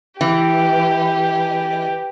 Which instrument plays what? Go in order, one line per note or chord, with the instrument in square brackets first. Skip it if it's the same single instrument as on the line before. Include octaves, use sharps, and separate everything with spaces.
[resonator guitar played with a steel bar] E3 [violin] G4